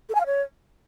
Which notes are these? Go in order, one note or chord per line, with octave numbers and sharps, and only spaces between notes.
A4
G#5
F5
C#5